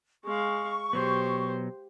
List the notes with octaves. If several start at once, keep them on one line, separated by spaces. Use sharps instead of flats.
G#3 F5 C#6
B2 F#3 B3 G4 C5